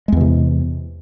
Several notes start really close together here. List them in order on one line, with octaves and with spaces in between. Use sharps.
G#3 E2 E3 C3